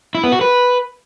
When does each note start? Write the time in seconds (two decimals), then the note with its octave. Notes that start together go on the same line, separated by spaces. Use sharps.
0.15 E4
0.23 B3
0.32 F#4
0.41 B4